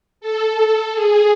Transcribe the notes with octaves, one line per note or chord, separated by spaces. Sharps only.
A4
G#4